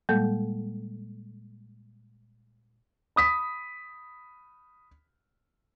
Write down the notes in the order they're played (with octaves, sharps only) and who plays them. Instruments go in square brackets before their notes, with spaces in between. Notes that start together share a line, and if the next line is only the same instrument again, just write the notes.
[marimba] A#2 G3 G#3 A#3 A4 G6
[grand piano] B5 D#6 B6